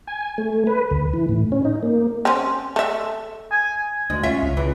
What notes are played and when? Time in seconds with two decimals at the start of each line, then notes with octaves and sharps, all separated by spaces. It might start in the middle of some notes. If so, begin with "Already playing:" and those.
0.07 G#5
0.38 A3
0.67 B4
0.91 D2
1.13 E3
1.29 A2
1.52 C#4
1.65 D#4
1.83 A#3
2.25 C4 C#4
2.76 A3 E5
3.51 G#5
4.10 D2 G#3
4.23 C#4 F4 E5
4.43 C#2
4.57 C#2 E3